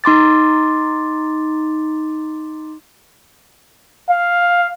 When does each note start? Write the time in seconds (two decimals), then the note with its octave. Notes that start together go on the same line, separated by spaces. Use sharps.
0.04 D#4 C6 D6 A6
4.09 F5